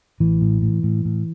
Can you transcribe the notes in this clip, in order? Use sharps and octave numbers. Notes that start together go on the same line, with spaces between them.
A1 E3
A2
A2
A2
A2